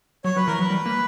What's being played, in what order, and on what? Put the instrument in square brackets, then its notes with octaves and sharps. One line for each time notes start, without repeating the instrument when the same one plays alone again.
[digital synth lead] F#3 [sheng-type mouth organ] C#5
[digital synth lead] F#3 [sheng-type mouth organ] B4
[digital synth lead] E3 [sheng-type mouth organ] A#4
[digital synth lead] F#3 [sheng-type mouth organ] B4
[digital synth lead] G3
A#3